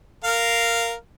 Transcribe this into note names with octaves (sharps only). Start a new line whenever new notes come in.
A#4 F5